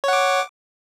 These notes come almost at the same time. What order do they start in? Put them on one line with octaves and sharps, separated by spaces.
C#5 F#5 D6